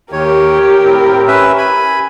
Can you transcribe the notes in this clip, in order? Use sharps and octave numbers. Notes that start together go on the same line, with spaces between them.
D#2 D#3 G4 A#4 C#5
A2 C4
C#4 B4 E5
G#5 B5